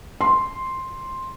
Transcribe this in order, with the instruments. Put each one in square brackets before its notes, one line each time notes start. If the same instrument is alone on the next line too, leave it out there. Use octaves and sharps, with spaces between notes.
[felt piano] C6